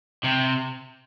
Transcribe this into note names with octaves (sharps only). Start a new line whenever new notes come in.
C3